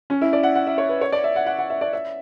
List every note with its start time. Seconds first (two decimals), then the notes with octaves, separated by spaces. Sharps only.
0.10 C#4
0.21 E4
0.33 D5
0.43 F#5
0.55 F#5
0.67 E5
0.78 C#5
0.89 B4
1.01 C#5
1.12 D5
1.24 E5
1.36 F#5
1.46 F#5
1.59 F#5
1.70 E5
1.81 D5
1.93 E5